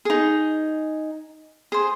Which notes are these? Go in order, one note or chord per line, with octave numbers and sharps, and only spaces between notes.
D#4 G#4
G#4 C5